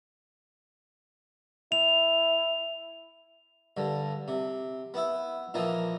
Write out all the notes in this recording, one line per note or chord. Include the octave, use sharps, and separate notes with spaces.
E4 F7
G2 D3
C3
B3 E4
A#2 E3 F3 D#4